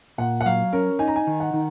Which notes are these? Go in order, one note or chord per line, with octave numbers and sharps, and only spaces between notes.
A#2 F#5
F#5
F#3 F5
C#4 A#4
D#4 G#5
A#5
G#5
D#3
F#5
D#3